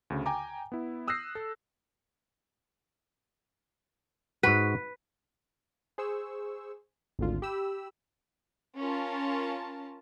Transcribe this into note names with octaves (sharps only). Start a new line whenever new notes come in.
D2 C#3
G5 G#5 A#5 D6
B3 E4
D#6 E6 F#6 G6 A#6 C7
A4
G#2 F#4 B4
G#4 C5 C#6 E6
G#1 D2 D3 F4
G4 B5 E6
C#4 F4 A#4 A5